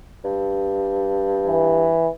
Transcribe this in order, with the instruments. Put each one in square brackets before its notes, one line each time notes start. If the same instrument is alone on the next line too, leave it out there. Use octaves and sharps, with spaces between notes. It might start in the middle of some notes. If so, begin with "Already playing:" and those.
[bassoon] G2
[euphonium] E3